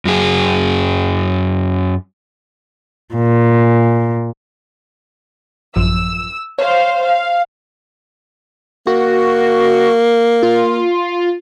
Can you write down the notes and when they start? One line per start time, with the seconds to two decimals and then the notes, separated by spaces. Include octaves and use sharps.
0.05 F#2 F#3 G#4
3.14 A#2
5.76 A1 F#2 F3 E6
6.59 C5 C#5 F5
7.03 F5
8.87 A#3 F#4
10.43 F4